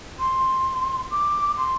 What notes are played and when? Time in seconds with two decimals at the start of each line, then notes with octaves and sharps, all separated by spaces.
0.20 C6
1.11 D6
1.57 C6